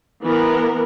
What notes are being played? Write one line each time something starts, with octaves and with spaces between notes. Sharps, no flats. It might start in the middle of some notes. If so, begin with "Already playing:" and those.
E3 B3 A#4